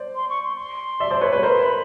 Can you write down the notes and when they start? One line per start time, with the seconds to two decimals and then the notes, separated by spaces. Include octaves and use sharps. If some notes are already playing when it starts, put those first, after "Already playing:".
Already playing: C5 D5
0.15 C6
0.29 C#6
0.44 C6
0.58 C6
1.00 D5 E5
1.11 C5 D5
1.21 B4 C#5
1.32 B4 C#5
1.42 A#4 C5 B5
1.52 C6
1.62 B5